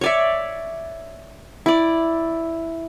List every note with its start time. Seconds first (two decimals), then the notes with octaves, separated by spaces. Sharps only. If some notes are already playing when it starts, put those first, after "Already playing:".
0.01 C#5 D5 E5
1.66 E4 D5